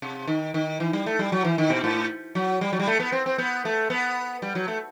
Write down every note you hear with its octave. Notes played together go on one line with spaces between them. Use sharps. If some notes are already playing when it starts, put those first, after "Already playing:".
C3
D#3
D#3
E3
G3
A3
G3
F#3
E3
D#3
B2
A2
F#3
G3
F#3
G3
A3
B3
C4
C4
B3
A3
B3
G3
F#3
A3